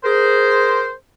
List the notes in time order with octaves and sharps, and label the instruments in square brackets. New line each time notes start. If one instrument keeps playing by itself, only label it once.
[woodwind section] G#4 A#4 C5